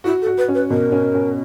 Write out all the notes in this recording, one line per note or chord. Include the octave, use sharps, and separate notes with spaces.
E4 F#4
A4
F#4
B4
C#4
B4
B2 A#4
C#4
C#4